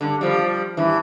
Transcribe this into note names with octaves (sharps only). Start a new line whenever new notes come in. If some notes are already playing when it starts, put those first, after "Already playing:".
G2 D3
F3 G3
G2 E3